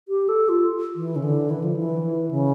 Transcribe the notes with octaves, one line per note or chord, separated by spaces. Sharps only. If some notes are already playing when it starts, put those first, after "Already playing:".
G4
A4
F4
E3
C#3
D3
E3
F3
E3
C#3